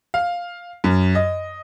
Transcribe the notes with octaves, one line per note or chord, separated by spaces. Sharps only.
F5
F#2
D#5